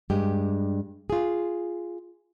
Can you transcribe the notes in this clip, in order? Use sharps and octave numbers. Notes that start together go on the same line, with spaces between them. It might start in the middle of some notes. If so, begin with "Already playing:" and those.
G2 G#3 G4
F4 G#4